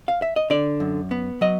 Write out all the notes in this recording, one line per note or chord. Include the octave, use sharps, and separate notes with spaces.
F5
E5
D#5
D3 D5
F#2
B3
F#3 D#5